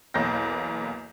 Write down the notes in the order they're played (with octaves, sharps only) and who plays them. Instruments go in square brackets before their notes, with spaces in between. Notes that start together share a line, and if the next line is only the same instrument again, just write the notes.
[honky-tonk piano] B1 E2 A#3 G6 A#6